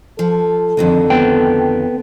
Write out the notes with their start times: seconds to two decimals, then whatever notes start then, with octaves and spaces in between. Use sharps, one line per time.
0.19 F3 A4
0.77 F2 D3 D#3
1.10 B3 G5